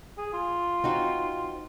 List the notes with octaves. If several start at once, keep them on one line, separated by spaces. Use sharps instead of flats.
G#4
F4
C4 D#4 F#4